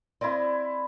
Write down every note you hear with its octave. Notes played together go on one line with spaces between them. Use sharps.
C4 E4 D5 D#5